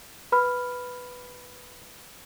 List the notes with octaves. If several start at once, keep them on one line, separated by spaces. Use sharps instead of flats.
B4 B5 F6